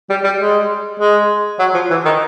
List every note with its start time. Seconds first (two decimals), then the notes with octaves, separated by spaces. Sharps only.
0.10 G3
0.24 G3
0.40 G#3
1.00 G#3
1.59 F#3
1.74 F3
1.90 E3
2.05 D#3